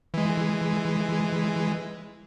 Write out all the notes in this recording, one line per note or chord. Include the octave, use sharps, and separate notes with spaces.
E3 G#3